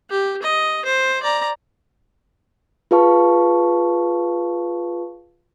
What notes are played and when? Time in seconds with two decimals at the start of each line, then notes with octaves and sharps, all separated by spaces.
0.10 G4
0.43 D#5
0.85 C5
1.23 D5 A#5
2.91 F4 G#4 B4 F5 A5 C#6